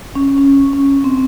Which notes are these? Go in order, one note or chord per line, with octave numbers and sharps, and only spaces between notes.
C#4
C#4
C#4
C4